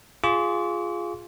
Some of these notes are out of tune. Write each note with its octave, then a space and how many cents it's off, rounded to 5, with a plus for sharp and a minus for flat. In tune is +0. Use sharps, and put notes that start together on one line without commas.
F4 +0 G#4 +0 D6 -45